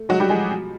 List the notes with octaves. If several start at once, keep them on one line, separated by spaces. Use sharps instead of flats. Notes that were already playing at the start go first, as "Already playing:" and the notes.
Already playing: A3
F#3 G#3 F#4
G3 G4
F3 G#3 G#4
B2